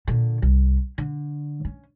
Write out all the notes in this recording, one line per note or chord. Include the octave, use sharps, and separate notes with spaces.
A#2 D3
C2
D3
C#4